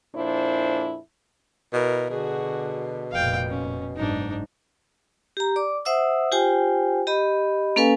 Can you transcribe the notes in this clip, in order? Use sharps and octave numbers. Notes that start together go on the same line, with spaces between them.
F2 A#2 D4 E4 C5
B2 E4 A#4
B2 D3 F#4 G#4
F1 A#2 F5 G5
C#4
F#1 G#2 D4 D#4
G4 A#5
D5 D6
C5 E5 F#5 D#6 E6
F4 G4 C5 G5 G#5
G4 D#5 B5
A#3 C#4 A4 B4 F5 G#5